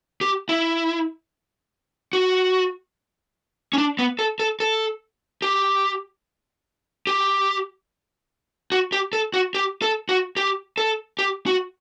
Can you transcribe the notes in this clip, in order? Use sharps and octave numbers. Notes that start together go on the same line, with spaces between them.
G4
E4
F#4
C#4
D4
B3
A4
A4
A4
G4
G4
F#4
G4
A4
F#4
G4
A4
F#4
G4
A4
G4
F#4